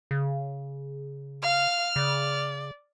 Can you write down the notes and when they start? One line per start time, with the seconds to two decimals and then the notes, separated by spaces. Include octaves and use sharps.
0.11 C#3
1.42 F5 F6
1.96 C#3 D5